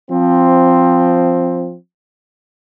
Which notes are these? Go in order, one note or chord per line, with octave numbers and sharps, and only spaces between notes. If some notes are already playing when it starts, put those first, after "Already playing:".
F3 C4